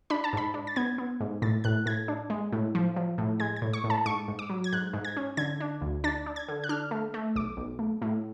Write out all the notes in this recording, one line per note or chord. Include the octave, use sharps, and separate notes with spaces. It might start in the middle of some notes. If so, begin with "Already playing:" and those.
D4 B5
A5
G#2 B5
D4
A6
B3 G#6
B3
G#2
A2 A6
A2 F#6
A2 G#6
D4
G#3
A2
F3
F3
A2
G#3 G#6
G#6
A2
C#6
A2
A5
G#2 C#6
G#2
D6
F#3
G#6
G#2 F#6
G#2
G#6
C#4
D3 G#6
D4
D2
D4 A6
D4
G#6
D3
F#6
D4 F6
A3
A3
B1 D6
B1
A3
A2